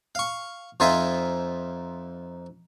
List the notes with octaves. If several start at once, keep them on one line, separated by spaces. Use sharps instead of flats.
F5 C#6
F2 D#4 F4 C5 E5 G#5